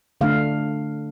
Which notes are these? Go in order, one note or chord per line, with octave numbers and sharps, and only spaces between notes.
D3 A3 D4 F5